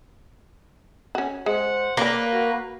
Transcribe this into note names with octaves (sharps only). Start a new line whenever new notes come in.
C#4 F#4
G#3 C5 F#5
A#3 B4 C#5 D5
F#4